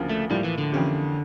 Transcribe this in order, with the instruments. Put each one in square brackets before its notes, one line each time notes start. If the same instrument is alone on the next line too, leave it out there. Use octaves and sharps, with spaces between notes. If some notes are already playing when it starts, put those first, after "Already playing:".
Already playing: [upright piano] D2 C#3 F3 A#3 D4
[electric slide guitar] A3
[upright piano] A2 F3 A#3 [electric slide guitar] G3
[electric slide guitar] E3
D3
[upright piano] F2 E3 A#3 C#4 G4